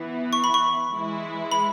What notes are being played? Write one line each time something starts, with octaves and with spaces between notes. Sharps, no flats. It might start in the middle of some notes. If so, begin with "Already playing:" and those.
Already playing: E3 B3 E4
C#6
B5
C#6
E3 G#3 E4
B5